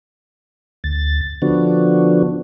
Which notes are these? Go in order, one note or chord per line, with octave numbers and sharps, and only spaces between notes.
D2 A6
D3 F3 B3 D4 F#4